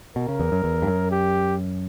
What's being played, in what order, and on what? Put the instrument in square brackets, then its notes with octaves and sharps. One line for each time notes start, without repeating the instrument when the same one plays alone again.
[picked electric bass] B2 [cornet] A#4
[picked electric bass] C#3
E2
F#2
E2
G2
F#2
[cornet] G4